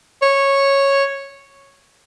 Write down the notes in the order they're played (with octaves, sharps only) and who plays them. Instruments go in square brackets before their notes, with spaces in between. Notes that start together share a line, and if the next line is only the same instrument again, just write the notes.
[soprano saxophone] C#5